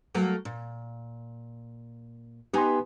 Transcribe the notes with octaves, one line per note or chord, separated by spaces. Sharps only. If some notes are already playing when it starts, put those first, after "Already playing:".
F#3 A3 A#3
A#2
B3 D#4 G4 G#5 C6